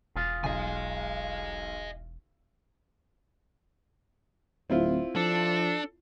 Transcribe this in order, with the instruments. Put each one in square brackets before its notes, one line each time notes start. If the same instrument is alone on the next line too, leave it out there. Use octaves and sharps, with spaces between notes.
[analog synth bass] E1 [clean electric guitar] F4 G#4
[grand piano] B1 [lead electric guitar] D#5 G#5
[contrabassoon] D1 [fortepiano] C4 E4 F4
[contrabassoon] F3 [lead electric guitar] D4 [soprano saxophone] A4